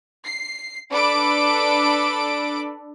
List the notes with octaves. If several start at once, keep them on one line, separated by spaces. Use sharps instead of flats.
C7
D4 A4 B4 B5 D6 D7